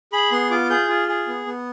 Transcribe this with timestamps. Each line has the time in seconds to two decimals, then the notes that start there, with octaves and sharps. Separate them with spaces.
0.12 G#4 B5
0.32 B3 C6
0.50 F4 D6
0.70 G#4 G6
0.89 F4
1.08 G#4
1.27 B3
1.46 B3